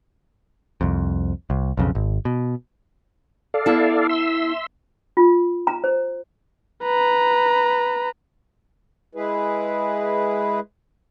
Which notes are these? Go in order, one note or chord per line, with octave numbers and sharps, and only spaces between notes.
C2 F2
C2
B1 F2 C#3
G#1
B2
A4 D5 F5
B3 E4 A5
E5 C6 E6
F4
A#5
C5
B4 A#5
G#3 E4 G#4 B4